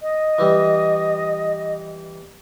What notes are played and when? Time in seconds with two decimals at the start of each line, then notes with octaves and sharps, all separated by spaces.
0.01 D#5
0.38 E3 G3